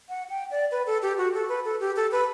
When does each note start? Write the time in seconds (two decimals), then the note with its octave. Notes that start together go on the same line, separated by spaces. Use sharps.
0.09 F#5
0.30 G5
0.51 D5
0.71 B4
0.86 A4
1.02 G4
1.18 F#4
1.34 A4
1.49 B4
1.65 A4
1.80 G4
1.96 A4
2.12 B4